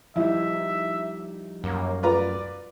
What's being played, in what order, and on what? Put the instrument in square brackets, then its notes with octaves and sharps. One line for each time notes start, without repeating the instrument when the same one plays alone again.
[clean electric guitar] F3 G3 D#4 [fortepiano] E4 [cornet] E5
[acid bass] F#2 [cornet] A#3
[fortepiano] F4 B4 A#5 [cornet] D5